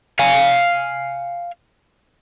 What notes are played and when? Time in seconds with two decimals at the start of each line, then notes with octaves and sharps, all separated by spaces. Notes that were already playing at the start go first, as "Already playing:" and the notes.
0.19 F5 G#5